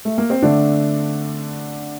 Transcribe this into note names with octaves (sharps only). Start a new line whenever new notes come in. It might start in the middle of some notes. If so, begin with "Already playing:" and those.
A3
A#3
C4
D3 A3 D4